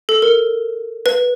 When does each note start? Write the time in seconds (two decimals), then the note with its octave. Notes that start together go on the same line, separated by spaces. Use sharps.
0.09 A4
0.22 A#4
1.06 B4